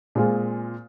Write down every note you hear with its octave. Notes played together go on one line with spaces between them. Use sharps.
A#2 G#3 C4 F4 G#4